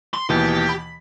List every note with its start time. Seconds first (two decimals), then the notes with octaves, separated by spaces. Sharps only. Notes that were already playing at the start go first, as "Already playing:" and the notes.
0.14 C6
0.29 D#2 B2 E3 G4
0.69 B5